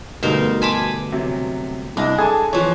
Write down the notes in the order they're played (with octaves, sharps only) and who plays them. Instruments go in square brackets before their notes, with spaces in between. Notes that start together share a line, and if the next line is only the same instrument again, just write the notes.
[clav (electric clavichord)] D2 G2 B2 [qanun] D#4 A#4 C5
[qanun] G#5 B5 D6 [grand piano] A5 C6 E7
[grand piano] C3 F#3
[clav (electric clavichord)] C2 [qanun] D4 [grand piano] E4 D#5
[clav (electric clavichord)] G#4 [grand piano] A4 G#5 A5
[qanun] E3 F3 [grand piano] C#5